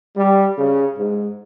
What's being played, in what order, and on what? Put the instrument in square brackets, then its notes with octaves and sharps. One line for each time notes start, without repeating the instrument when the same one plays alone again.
[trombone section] G3
C#3
G#2